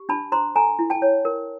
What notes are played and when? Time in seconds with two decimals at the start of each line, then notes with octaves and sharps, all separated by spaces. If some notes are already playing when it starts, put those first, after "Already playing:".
Already playing: G4
0.09 D4 A5 B5
0.32 C5 A#5 C6
0.56 A4 G#5 A#5
0.79 E4
0.90 G5 A5
1.02 C#5
1.25 A#4